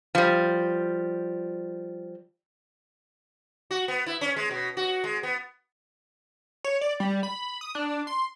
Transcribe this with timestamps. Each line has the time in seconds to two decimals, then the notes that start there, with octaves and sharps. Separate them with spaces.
0.15 F3 G3
3.71 F#4
3.88 B3
4.06 E4
4.21 C#4
4.36 G#3
4.51 B2
4.77 F#4
5.04 G#3
5.23 B3
6.64 C#5
6.81 D5
7.00 G3
7.23 B5
7.61 D#6
7.75 D4
8.07 C6